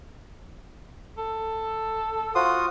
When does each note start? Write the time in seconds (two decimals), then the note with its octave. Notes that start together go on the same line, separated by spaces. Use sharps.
1.18 A4
2.35 F4 F#4 C5 D#6